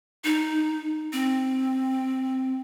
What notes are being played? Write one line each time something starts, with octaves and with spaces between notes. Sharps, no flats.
D#4
C4